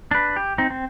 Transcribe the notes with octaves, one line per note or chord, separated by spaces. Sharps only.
D4 B4
G4
C4 D#4
C4